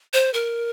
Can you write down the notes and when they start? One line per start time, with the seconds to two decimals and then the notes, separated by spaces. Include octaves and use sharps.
0.13 C5
0.34 A#4